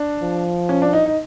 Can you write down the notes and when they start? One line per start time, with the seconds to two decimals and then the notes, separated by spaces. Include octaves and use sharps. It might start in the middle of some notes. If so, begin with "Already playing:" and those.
Already playing: D4
0.22 F3
0.69 C#4
0.82 D4
0.93 D#4
1.06 D#4